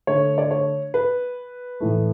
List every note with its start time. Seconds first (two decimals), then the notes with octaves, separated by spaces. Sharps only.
0.07 D3 A3 C#5
0.38 D5
0.51 C#5
0.94 B4
1.80 A2 E3 A3